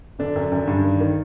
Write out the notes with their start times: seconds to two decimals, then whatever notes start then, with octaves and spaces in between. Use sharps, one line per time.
0.19 F#2 D3 D4
0.36 F#2
0.52 F#2
0.67 G2
0.84 D#3
1.00 D#3